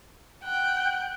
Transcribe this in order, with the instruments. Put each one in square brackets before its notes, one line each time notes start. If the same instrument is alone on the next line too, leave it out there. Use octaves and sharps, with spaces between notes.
[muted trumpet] F#5 [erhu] G5 [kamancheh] F#6